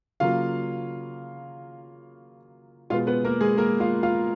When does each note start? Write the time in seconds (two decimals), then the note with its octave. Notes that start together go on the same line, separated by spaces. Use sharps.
0.20 C#3 F#3 A#3 F4 F5
2.90 B2 G#3 B3 F4 F5
3.07 B3 B4
3.25 A#3 A#4
3.41 G#3 G#4
3.57 A#3 A#4
3.80 F4 F5
4.03 F4 F5